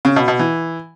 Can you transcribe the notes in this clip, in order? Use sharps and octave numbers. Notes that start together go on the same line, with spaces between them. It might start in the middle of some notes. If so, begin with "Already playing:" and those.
C#3
B2
B2
E3